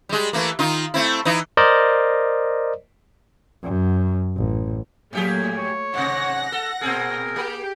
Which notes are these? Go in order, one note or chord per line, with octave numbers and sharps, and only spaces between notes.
G3 G#3
E3 A3 A#3
D#3 D#4 F4
A3 C4 E4
E3 D#4
A#4 C5 D5 D#5
F#2
A1
A2 F#3 A3 A#3 G4 G#4
C#5
G#2 C3 F#5 A#6
A4
A#2 C4 G#4 A#4
A#3 G4